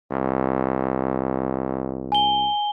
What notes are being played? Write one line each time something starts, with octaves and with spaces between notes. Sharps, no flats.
C2
G#5 G7